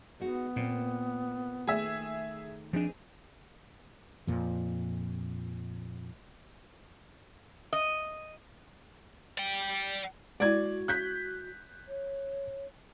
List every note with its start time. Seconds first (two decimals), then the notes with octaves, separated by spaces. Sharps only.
0.20 G#3 B3 D#4 F#4
0.56 A#2 A#3 C4
1.67 D#3 A3 G#4 E5
2.73 F3 C4 D4 D#4 G#4
4.27 F2 A#2 F3
7.73 D#5
9.38 D5 G5
10.40 G#3 E4 F#4 D5 G#6
10.88 F#6 G6 B6
11.88 C#5